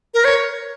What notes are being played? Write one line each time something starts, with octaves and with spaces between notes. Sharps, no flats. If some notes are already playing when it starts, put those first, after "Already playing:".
A#4
C#5